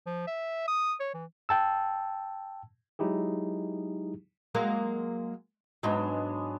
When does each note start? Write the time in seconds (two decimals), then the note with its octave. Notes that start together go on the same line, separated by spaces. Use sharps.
0.06 F3
0.27 E5
0.68 D#6
1.00 C#5
1.14 E3
1.49 G5 A5 E6
2.99 F#3 G#3 D#4 E4 G4 G#4
4.54 F#3 G#3 A#3
5.83 G#2 F#3 G#3 B3 D4